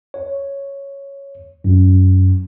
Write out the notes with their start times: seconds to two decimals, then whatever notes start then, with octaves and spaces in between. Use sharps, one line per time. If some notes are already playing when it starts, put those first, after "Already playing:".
0.14 C#5
1.64 F#2